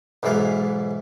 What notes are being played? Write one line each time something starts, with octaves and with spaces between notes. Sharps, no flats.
B1 G#2 E3 D5 F5